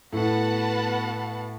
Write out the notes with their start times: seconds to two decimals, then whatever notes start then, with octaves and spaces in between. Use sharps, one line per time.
0.13 A2 B3 F#4 B4 F#5 A5